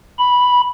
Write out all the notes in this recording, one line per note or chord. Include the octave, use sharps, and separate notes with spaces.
B5